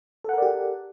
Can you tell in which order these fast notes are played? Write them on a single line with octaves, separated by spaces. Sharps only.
A4 F#5 A#4 D5 G4